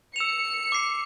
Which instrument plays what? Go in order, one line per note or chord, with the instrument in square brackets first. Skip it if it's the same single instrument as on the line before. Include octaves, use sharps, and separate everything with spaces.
[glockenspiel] E6 E7 F7 [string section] C#7
[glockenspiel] D6 C7